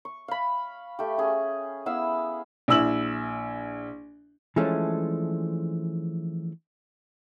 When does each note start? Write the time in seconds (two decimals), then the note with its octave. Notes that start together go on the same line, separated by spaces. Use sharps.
0.05 C#6
0.28 F5 B5
0.99 A3 G4
1.18 C#4 G#4
1.86 B3 E4 F5 E6
2.68 A#1 E4 E6 F#7
4.56 E3 F3 G#3 A3 C#4 D4